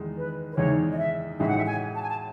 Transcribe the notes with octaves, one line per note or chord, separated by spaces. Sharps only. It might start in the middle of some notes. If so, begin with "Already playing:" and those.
Already playing: E2 D#3 G#3 D#4
B4
B4
E2 D#3 G#3 D#4 C#5
D#5
E5
A1 A2 G#3 D#4 F#4 E5
F#5
E5
G#5
A5
G#5
A5